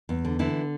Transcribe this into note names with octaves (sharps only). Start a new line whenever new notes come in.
E2
D3
D3 E3 E4